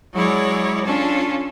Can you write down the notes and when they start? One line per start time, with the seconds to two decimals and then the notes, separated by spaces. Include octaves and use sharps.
0.14 F#3 G#3 E4 G#4 C#5 D5
0.85 C#4 D4 F4 A4